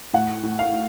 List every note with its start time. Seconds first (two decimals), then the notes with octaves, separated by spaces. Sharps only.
0.13 A2 F#5
0.43 A2
0.59 F5